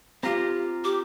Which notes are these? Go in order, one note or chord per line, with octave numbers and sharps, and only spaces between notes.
C4 F4 G4 A#5
G4 D6